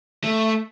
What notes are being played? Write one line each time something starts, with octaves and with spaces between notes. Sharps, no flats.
A3